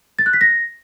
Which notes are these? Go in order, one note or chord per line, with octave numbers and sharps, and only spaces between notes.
A6
F#6
B6
A#6